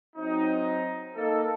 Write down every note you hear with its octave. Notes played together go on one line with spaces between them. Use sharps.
F#3 C4 D#4
A#3 D#4 A4